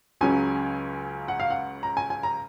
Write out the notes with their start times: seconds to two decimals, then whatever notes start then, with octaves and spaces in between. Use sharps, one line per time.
0.21 C#2 C#3 F#3 C#4 G#5
1.28 F#5
1.40 F5
1.50 F#5
1.83 A#5
1.97 G#5
2.10 G#5
2.23 A#5